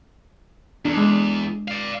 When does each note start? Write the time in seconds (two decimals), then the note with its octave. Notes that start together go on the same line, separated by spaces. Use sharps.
0.85 E2 D4
0.97 G#3
1.68 D5 F5